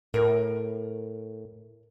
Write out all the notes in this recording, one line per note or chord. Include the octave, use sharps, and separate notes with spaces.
A2 A#4 G5